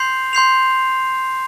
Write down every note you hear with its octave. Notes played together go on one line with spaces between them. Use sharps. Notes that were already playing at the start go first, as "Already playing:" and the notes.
Already playing: C6 G6 C7 F7
C6 G6 C7 F7